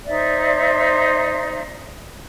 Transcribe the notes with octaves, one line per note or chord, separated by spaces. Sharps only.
D#4 C5 D5 E5